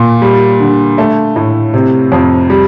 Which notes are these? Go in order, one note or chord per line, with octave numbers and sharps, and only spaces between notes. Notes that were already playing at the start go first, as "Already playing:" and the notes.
Already playing: A#2
G3
D3
A3
A2
C3
F2
G3